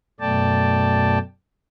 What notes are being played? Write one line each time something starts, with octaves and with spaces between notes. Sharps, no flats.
F#2 B2 A3 D5 G5 A5